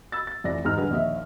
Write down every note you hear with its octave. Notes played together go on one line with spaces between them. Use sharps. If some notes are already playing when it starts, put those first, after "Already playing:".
B5 E6 A6
A6
F1 F2 E3 D5 A#6
E2 G#2 D#4 F6
D3 G3 G#4 B4
A#1 D#2 D#5 E5